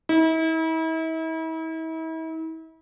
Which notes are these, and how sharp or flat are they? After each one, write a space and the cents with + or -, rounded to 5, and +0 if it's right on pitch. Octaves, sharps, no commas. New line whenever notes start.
E4 -40